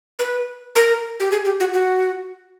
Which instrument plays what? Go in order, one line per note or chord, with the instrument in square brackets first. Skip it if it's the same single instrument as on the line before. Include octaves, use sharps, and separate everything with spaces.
[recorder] B4
A#4
G4
G#4
G4
F#4
F#4